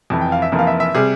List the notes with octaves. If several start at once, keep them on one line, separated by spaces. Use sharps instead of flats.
F1 F2 E3
G5
F5
E5
F1 F2 E3 A#3
F5
E5
E5
C3 G3 G#4